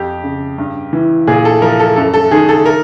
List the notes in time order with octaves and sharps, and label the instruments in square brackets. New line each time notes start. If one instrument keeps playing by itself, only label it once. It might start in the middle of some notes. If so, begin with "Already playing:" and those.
Already playing: [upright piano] F2 G4
C#3
G2
E3
A#2 G#4
A4
F3 A#4
A4
F#2 A4
A4
D#3 G#4
A4
A#4